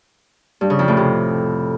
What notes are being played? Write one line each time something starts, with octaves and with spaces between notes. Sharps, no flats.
G2
C#3
F2
A2
C3